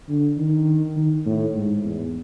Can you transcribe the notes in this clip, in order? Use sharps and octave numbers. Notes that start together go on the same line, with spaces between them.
D3
D#3
D#3
A2
G#2
E2